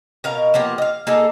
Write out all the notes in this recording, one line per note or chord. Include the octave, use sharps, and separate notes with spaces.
B2 A#4 F5
F3 A#3 B3 G4
D#5 F5
A#3 D#4 G#4 A4